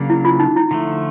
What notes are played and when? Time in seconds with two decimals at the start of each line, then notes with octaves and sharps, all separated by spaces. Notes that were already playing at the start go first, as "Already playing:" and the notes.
Already playing: C#3 F#3 A#3 D4
0.10 E4
0.25 F4
0.40 D#4
0.56 E4
0.71 D3 F3 A3